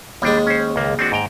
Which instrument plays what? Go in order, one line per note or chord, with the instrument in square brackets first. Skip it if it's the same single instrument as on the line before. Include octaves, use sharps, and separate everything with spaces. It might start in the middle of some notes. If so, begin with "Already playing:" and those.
[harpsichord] D#2 G#3 [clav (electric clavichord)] G3 D4
[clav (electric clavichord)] C#4 C5
C#2 A#3
C4 D4 F#4
G#2 G5 A#5